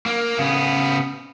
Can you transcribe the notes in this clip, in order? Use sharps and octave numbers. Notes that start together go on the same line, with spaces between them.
A#3
C#3 B3